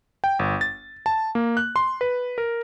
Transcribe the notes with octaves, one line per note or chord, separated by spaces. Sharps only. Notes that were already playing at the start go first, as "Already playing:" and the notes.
G5
G1
A6
A5
A#3
F#6
C6
B4
A#4